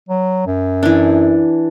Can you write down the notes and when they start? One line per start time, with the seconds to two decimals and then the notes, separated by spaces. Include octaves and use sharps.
0.09 F#3
0.47 F#2
0.83 E3 D4